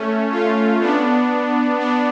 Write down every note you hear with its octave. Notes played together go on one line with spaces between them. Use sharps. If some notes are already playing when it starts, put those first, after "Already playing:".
Already playing: A3 C#4
C#4 F4
B3 D4
B3 D4